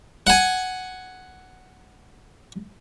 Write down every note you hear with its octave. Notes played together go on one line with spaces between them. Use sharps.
F#5 G#5